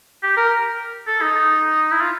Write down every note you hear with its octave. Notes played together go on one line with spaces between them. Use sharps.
G4
A#4
A4
D#4
E4
F4